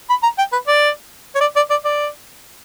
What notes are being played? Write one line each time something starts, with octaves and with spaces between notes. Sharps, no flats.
B5
A#5
G5
B4
D5
C#5
D5
D5
D5
D5